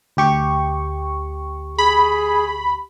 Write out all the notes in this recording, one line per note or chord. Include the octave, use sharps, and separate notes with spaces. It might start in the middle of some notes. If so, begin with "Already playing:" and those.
D2 G4 C#6
G#4 B5